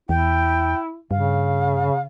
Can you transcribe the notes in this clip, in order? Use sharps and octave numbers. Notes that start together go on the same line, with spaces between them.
E2 E4 G5
G2 C#3 F5